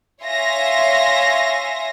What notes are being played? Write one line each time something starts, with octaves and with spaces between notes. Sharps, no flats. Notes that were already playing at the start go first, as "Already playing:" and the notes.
C#5 E5 F5 G#5 C6 A#6